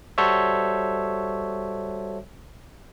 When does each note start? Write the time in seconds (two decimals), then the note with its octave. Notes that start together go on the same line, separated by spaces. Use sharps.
0.18 G3 F#4 A4 C5 C#5 E5